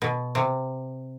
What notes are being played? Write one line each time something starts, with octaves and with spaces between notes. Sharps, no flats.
B2
C3